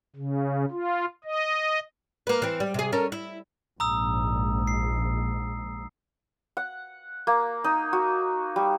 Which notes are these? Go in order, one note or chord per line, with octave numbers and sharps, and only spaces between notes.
C#3
F4
D#5
A#3 B4
E3 C4
G3
C3 G#4
C#4 A4 A#4
E4
A#1 G#2 A#5 D#6 E6
C7
F#5
A#3
D#4
F#4
G3